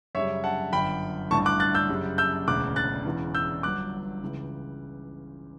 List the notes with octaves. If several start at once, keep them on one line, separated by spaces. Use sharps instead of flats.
F#2 C#3 G3 C#5 E5
F#5 A5
G1 F#2 D3 G5 B5
A1 G2 D3 A5 C#6
D6 F#6
F#6 A6
E6 G6
F#2 C#3 G3
E6 G6
E1 D2 C#3 D6 F#6
F#6 A6
E1 E2 C#3 E3
E6 G6
G1 G2 F#3 D6 F#6
C#2 C#3 E3